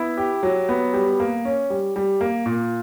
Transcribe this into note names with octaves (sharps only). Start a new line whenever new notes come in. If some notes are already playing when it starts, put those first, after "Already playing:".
Already playing: B3 E4
G4
F#3
B3
G3
A#3
C#4
G3
G3
A#3
A#2